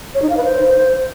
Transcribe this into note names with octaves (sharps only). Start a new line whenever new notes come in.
C#5
D#4
F5
B4
C5